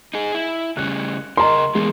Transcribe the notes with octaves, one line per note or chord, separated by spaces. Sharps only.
D#4 G#4
E4
C#3 G3 C#4 F#6
C#3 A#4 D#5 A#5 C6
E3 G#3 A#3 B3